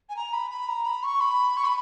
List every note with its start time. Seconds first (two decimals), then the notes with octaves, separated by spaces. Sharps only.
0.09 G#5
0.16 A#5
0.33 B5
0.51 B5
0.68 A#5
0.86 B5
1.03 C#6
1.21 B5
1.57 C#6
1.65 B5